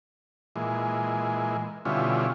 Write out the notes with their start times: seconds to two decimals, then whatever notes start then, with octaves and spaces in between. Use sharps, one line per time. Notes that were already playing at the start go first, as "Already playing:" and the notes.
0.56 A#2 E3 G#3
1.85 B2 D3 G3 C#4 E4 F4